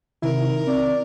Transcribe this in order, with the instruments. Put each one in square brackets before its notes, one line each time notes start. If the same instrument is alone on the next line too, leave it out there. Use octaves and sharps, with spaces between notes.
[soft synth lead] C3 [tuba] D#3 [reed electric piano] E4 [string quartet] A#4
[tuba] C4 [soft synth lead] D5